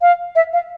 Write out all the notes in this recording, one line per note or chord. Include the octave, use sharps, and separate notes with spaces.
F5
E5
F5